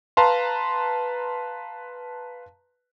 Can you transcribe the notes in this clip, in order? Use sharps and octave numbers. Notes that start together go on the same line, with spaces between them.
B4 F5 A5 A#5 C6